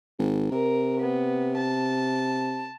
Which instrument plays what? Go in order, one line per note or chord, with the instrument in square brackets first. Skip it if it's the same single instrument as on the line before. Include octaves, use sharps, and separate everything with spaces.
[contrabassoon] G#1
[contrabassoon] C3 [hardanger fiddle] A#4
[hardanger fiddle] B3
A5